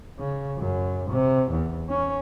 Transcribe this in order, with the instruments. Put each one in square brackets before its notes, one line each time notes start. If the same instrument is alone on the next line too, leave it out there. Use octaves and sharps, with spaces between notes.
[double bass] C#3
F#2
C3
E2
C#4